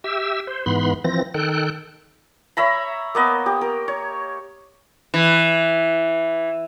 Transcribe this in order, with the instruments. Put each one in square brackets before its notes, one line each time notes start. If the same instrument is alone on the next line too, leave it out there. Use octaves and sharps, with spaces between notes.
[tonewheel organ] G4 E5 E6
C5
G#2 E3 B3 B5 C6
E3 F3 C4 A#6
D#3 A4 G5 F#6
[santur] C#5 E5 A#5 B5
A#3 B3 D#5
G4
A#4
C#5
[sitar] E3